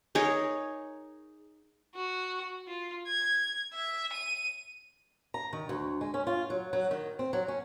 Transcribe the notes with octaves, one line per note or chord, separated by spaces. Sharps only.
D#4 G#4 A#4 C#5
F#4
F4
G#6
E5
D#7
A#5
D#3
D2
G#3
C#4
F4
F#3
F#3
D#3
C4
F#3
C#4